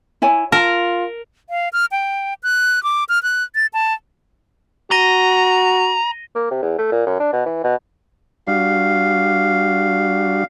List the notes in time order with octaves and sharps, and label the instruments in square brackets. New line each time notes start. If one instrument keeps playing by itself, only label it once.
[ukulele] E4 C#5 G#5
[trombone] F4 [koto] A#4 [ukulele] A5
[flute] F5
F6
G5
F#6
D6
F6
F#6
A6
A5
[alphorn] F#4 [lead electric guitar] A#5 [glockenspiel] A#6 D#7 G7
[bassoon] A#3
C3
E2
A3
A#2
F#2
D4
B2
E3
B2
[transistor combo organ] G3 D4 F#4 [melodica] F5